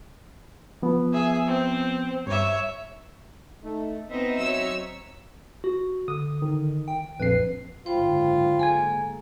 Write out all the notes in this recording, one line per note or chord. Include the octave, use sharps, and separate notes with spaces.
F3 B3
G#4 E5
C4
G2 C#5 E5
A3 D#4
B3 C4 D#4 E5
F#3 C#5 E6
F#4
D3 D#6
D#3
G5
A#1 F2 B4 C7
F#1 G#2 D3 F4 C5 G5 B5
A#3 G#4 A4 G#5 G#6